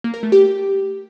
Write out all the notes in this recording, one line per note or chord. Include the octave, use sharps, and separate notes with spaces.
A#3
A#4
A3
G4